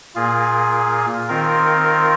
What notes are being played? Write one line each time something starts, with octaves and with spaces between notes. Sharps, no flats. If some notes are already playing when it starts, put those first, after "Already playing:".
A#2 A#3 F4 G#4
D#3 C4 F4 A#4